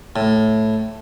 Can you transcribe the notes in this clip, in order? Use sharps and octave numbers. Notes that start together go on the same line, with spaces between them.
A2